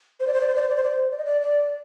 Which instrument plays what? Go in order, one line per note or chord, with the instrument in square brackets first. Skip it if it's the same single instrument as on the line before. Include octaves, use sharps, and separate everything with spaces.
[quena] C5
D5
C5
D5
C5
D5
C5
D5
C5
D5
C5
D5
D#5
D5
D5